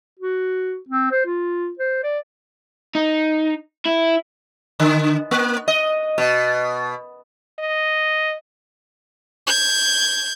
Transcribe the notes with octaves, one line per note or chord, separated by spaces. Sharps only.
F#4
C4
C5
F4
C5
D5
D#4
E4
D3
A#3
D#5
B2
D#5
G6 G#6